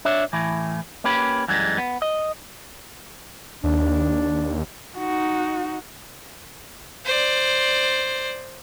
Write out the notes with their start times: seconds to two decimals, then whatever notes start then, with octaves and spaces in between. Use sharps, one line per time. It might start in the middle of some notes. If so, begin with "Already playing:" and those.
0.05 D4 C#5 E5
0.33 A2 E3
1.04 A#3 C#4 G4 B4
1.48 F#2 E3 G3 G#3
1.78 B3
2.02 D#5
3.64 D#2 D4
4.98 D#4 F#4
7.05 C5 D5